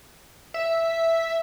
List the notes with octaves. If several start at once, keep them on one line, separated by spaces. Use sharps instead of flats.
E5